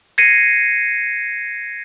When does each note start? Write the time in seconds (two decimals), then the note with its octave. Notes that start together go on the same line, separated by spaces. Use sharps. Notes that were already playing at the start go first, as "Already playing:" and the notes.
0.18 G#6 A#6 C7 C#7 D#7